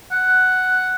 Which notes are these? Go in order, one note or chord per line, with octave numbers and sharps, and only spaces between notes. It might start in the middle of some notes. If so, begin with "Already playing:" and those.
F#5